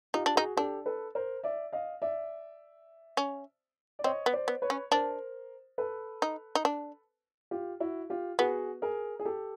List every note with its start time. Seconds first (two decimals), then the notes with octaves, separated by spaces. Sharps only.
0.14 D#4 F4 G4
0.26 D4
0.36 D#4 F#4 G#4
0.57 D4 G4 A4
0.86 A4 B4
1.15 A#4 C5
1.43 D5 E5
1.73 D#5 F5
2.02 D5 E5
3.17 C#4
3.99 D5
4.04 C4 C#5 D#5
4.26 B3
4.33 C5 D5
4.48 B3
4.62 B4 C#5
4.70 C#4
4.92 D4 A#4 C5
5.78 A4 B4
6.22 D#4
6.55 D#4
6.65 D4
7.51 F4 G4
7.80 E4 F#4
8.10 F4 G4
8.39 B3 F#4 G#4
8.82 G#4 A#4
9.19 G#4
9.25 G4 A4